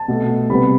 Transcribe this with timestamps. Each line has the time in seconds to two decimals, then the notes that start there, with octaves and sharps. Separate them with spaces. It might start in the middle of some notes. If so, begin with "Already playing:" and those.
Already playing: A5
0.08 B2 A3
0.49 C3 G3 B3 B5